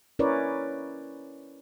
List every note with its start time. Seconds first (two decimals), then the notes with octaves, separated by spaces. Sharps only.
0.19 C#4 E4 A#4 B4 C#5 D5